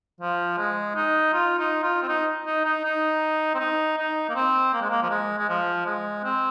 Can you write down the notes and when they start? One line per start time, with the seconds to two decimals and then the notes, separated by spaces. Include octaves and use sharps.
0.20 F3
0.58 G#3
0.95 D#4
1.33 F4
1.59 D#4
1.83 F4
2.03 C4
2.08 D#4
2.46 D#4
2.65 D#4
2.84 D#4
3.54 C4
3.59 D#4
3.97 D#4
4.29 A#3
4.35 C4
4.73 A#3
4.81 G#3
4.90 A#3
5.02 F3
5.10 G#3
5.38 G#3
5.49 F3
5.86 G#3
6.24 C4